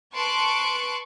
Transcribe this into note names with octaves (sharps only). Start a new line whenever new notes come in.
B4 A5 C6 C#6 F#6 D7